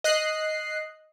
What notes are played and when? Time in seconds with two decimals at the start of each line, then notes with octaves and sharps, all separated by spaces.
0.04 D#5 F#6 C7